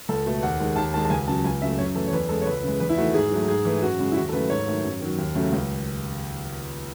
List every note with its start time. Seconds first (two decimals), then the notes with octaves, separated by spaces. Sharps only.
0.09 C#2 A4
0.26 B2 A3
0.43 D#2 F#5
0.60 D#3 G#3
0.76 D#2 A5
0.94 D#3 G#3 A5
1.05 A5
1.10 C#2 G#5
1.28 C#3 F#3 A5
1.44 C#2 G#5
1.61 C#3 F#3 A3 E5
1.78 F#2 C#5
1.95 E3 A3 A4
2.08 C#5
2.12 E2 B4
2.29 C#3 G#3 A4
2.41 C#5
2.46 C#2 B4
2.63 C#3 E3 G#3
2.80 E2 B4
2.89 E4
2.97 D#3 A3 F#4
3.14 G#2 G#4
3.31 F#3 A3
3.48 G#2 G#4
3.65 E3 A3
3.82 F#2 F#4
3.99 C#3 G#3
4.12 E4
4.16 D#2 F#4
4.29 A4
4.32 C#3 F#3 A3 B4
4.50 G#2 C#5
4.67 D#3 F#3 A3
4.84 F#2
5.01 D#3 F#3
5.18 D#2
5.35 C#3 F#3 A3
5.52 C#2